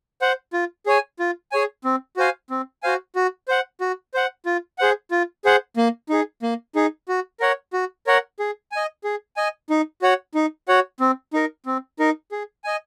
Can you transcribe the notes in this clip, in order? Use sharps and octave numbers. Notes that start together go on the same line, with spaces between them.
C5 F#5
F4
G#4 C#5 G#5
F4
G#4 C#5 G#5
C4
F#4 C5 F5 G#5
C4
F#4 C5 F5 G#5
F#4
C5 F#5
F#4
C5 F#5
F4
G#4 C5 F#5
F4
G#4 C5 F#5
A#3
D#4 G#4
A#3
D#4 G#4
F#4
A#4 C#5 F#5
F#4
A#4 C#5 F#5
G#4
D#5 G#5
G#4
D#5 G#5
D#4
F#4 C#5 F#5
D#4
F#4 C#5 F#5
C4
D#4 A#4
C4
D#4 A#4
G#4
D#5 G#5